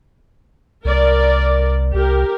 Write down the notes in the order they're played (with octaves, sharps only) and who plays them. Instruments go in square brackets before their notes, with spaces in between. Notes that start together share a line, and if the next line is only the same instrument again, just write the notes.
[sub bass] C2 [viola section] A#4 D5
[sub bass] C2 [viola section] G4 A#4